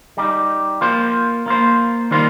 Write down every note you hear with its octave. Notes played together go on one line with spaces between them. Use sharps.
G3 D#4 G4
A#3 F4 C5
A#3 F4 C5
D#3 G3 A#3 F4 C5